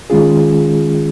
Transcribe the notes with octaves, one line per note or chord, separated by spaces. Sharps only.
D#3 G#3 C#4 F4 G#4